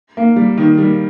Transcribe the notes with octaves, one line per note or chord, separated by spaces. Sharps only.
A#3
G3
D#3
G3